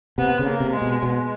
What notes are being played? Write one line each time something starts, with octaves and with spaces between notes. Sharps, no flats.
C3 B3
C#3
A#3
C3
G#3
B2
B2 G#3